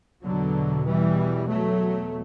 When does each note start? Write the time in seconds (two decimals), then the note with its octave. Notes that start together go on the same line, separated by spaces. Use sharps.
0.25 E2 B2 D3 F#3
0.86 E3 G3
1.48 F#3 A3